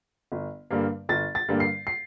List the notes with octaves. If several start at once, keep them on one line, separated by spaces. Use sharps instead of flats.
G1
G2 D3 G3 A#3
G1 A6
A6
G2 D3 G3 A#3
C7
C7